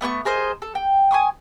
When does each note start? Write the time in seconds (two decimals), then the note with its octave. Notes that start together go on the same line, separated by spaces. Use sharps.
0.01 A3 B3 G5 C#6
0.25 G#4 A#4 C5 D#5
0.62 A4
0.75 G5
1.11 G#5 C6 C#6 D#6